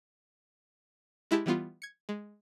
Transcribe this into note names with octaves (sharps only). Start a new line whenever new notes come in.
G#3 E4 G4 A5
E3 G3 B3 F4
G#6 C#7
G#3